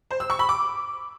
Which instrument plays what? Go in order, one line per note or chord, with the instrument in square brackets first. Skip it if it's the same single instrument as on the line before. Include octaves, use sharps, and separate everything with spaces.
[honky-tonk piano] C5
E6
C#6
B5
D6